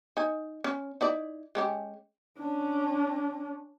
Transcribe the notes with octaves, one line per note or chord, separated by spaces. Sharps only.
D#4 G#5
C#4
D#4 E4 D5
G#3 C#4 G4
C#4 D4